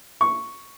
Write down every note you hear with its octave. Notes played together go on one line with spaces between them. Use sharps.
C#6